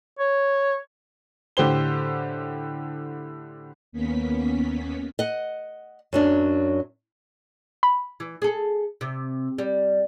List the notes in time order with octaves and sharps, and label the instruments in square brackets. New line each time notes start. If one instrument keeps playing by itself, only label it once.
[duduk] C#5
[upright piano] A2 D3 G4 C5 G7
[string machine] D#2 A#3 B3 C#4 B6
[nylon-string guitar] D#5 F#5
F#2 F#3 D4
[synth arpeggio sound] B5
[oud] E3
G#4 A4
C3
G3